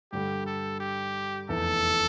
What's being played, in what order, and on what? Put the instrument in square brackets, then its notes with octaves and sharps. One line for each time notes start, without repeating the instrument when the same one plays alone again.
[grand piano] G2 D3 G3 [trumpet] G4
[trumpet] A4
G4
[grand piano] F1 E2 E3 [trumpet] A4